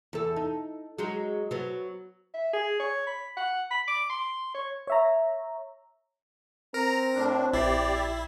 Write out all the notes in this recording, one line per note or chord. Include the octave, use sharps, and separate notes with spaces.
E2 A4
D#4
F#3 G#3 D#4
F#3 B3
E5
G#4
C#5
B5
F#5
B5
D6
C6
C#5
C#5 E5 A#5
C4 A#4 A#5
A2 D4
A#1 E4 G4 D5 C7